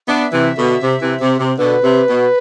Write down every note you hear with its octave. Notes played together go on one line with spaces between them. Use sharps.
B3 D4 E5
C3 E3
B2 D3
C3
C3 E3
C3
C3
B2 D3 B4
C3
B2